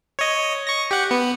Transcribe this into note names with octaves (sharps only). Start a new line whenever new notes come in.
C#5 D#5
C#6 A#6
G4 F#5
B3